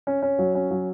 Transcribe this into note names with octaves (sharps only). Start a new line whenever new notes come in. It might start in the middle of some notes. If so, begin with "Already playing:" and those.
C#4
C#4
F#3
C#4
F#3